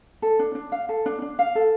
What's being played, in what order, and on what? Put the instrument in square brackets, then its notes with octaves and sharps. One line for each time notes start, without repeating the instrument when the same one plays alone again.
[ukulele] A4
D4
D4
F5
A4
D4
D4
F5
A4